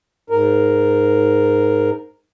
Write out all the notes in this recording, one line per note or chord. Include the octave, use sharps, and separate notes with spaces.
G#2 A#4